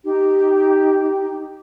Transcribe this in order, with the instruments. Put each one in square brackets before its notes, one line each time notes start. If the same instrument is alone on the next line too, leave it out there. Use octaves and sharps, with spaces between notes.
[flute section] D#4 G4